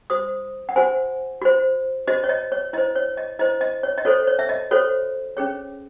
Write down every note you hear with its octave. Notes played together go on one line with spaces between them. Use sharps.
F#4 C5 D#6
F#5
F#4 C5 G#5
F#4 C5
F#4 C5 D#5
C#5
D#5
C#5
E4 C5 D#5
C#5
D#5
E4 C5 D#5
D#5
C#5
D#5
F#4 A4 C5 C#5
C#5
E5
D#5
F#4 A4 C5 C#5
C#4 G#4 C#5